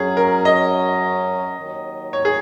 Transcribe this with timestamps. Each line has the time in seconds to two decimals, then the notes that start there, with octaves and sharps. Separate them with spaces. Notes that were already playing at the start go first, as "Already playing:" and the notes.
Already playing: F#2 F#3 C#4 G#4
0.17 A#4
0.45 D#5
1.58 D#2 D#3 F#3
2.13 C#5
2.25 G#4